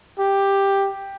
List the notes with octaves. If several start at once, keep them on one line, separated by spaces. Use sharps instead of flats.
G4